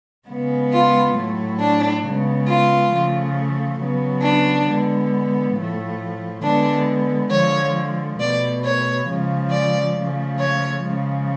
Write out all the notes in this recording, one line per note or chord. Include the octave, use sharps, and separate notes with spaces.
C#3 G#3 B3
F4
A2 F#3 A3
D4
C#3 G#3 B3
F4
C#3 F3 A3
C#3 F#3 B3
D4
D3 G#3 B3
A2 F3 A3
D3 G#3 B3 D4
D3 F3 G#3 C#5
B2 A3 D5
C#5
C#3 F3 G#3
D5
C#3 F3 A3
C#5
C#3 F3 G#3